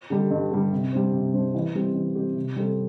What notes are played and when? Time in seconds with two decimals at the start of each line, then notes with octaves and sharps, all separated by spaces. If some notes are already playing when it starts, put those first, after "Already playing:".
0.10 D3 G3
0.31 G2
0.52 D3 G3
0.73 C3
0.93 G3 D4 C5
1.13 C3
1.34 G3 D4 C5
1.55 E3
1.75 G3 C4 G4
1.95 E3
2.15 G3 C4 G4
2.36 C3
2.56 G3 C4 A4